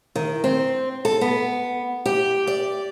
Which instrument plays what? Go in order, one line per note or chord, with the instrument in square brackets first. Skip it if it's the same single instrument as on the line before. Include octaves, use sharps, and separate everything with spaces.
[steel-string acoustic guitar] D#3
C4
A4
B3
G4
D5